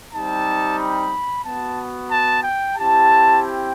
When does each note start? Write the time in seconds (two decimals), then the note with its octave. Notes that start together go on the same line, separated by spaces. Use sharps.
0.12 G3 C4 D#4 G4 A5
0.78 B5
1.44 B3 F#4 A5
2.10 A5
2.43 G5
2.76 C4 E4 G4 A5
3.42 G5